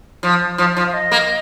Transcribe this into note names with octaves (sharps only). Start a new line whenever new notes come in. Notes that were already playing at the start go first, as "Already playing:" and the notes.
F3
F3
F3
F5
D#5
A#3